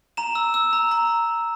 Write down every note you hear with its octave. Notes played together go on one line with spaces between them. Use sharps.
A#5 E7
E6
E6
A#5
A#5